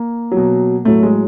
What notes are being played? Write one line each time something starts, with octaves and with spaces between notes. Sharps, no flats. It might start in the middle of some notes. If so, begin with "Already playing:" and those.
Already playing: A#3
F#3
B2
A2 F#3 A3
G#3